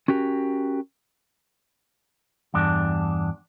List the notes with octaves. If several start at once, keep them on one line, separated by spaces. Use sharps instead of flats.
C#4 F#4 G4 A#4
E2 G2 D4